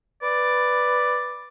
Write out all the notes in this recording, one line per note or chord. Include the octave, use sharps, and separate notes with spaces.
B4 D5